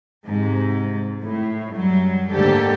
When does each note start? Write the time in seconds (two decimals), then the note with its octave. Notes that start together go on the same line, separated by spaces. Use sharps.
0.24 G#2 C3
1.23 A2
1.75 F#2 F#3 G3
2.32 D2 G#2 D3 A#3 G4 A4